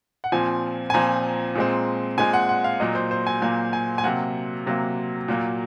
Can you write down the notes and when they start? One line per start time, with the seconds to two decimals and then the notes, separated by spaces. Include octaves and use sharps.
0.24 F#5
0.32 A#2 F3 C4 G#5
0.90 G#5
0.94 A#2 F3 C4 A#5
1.55 A#2 G#3 C4
2.18 A#2 G#3 C4 G#5
2.33 F#5
2.49 F#5
2.64 F5
2.80 A#2 F#3 A#3 D#5
2.95 C5
3.11 C5
3.27 G#5
3.41 A#2 F#3 A#3 G#5
3.73 G#5
3.98 G#5
4.04 C3 F#3 A#3 F#5
4.66 C3 F#3 A#3
5.28 A#2 F#3 A#3